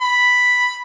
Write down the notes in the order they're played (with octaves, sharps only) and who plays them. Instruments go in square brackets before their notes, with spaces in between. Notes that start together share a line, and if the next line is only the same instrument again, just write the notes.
[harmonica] B5